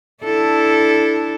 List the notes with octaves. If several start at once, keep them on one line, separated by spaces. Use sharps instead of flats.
D4 E4 A4